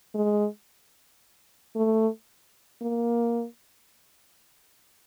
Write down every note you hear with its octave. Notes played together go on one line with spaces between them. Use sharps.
G#3
A3
A#3